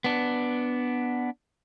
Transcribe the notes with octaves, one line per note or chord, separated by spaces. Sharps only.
B3 D4